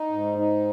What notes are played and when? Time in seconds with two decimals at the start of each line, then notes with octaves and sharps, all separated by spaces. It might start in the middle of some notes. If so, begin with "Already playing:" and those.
Already playing: D#4
0.11 G#2
0.38 D#4